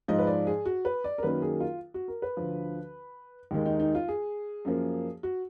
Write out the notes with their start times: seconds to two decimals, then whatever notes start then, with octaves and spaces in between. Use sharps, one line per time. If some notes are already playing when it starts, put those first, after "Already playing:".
0.08 G#2 F3 G#3 D#5
0.19 B4
0.27 D5
0.47 G#4
0.66 F#4
0.85 B4
1.04 D5
1.18 A#4
1.23 F#2 D#3 F#3 A#3 B4
1.42 G#4
1.60 F4
1.94 F#4
2.08 A#4
2.22 B4
2.37 D2 D3 F3
3.51 D#2 D#3 G#3
3.66 D#4
3.80 D#4
3.95 F4
4.08 G#4
4.65 F#2 F3 A#3
5.23 F#4